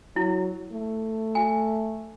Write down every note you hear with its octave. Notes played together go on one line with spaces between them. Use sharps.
F#3 E4
A3
G#5